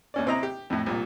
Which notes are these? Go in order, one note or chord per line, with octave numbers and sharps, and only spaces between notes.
D#2 C#4 D5
C3 C4 E4 D#5 A#5
G4
F2 A2
C2 A#2